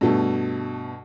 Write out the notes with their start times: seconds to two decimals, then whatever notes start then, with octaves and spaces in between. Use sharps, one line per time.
0.01 G2 B2 A3